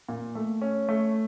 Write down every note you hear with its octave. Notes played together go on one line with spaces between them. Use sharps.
A#2
A3
C#4
A3